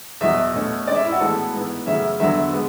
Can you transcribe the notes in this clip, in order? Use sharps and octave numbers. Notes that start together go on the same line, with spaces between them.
E2 B2 F#3 E5
B2 A3 C#4
G#2 G#3 C#4 D5
E5
E4
F#4
A2 E3 G#3 B3 A4
G#2 E3 B3
F#2 C#3 F#3 A3 C#4 E5
E2 D3 F#3 B3 E5
G#3 B3